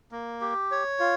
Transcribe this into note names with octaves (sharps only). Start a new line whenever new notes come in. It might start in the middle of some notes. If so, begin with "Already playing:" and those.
A#3
G4
C#5
F4